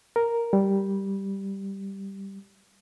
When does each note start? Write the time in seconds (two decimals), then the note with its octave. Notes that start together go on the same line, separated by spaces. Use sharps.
0.16 A#4
0.53 G3